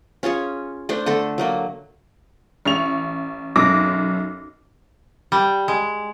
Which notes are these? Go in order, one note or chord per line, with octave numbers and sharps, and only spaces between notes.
C#4 F4 G#4 C#5
A3 D4 C5
D3 A3 A4
F#3 A3 A#3
A1 C#6 F7
B1 F#2 C#4 D6 A#6
G3
G#3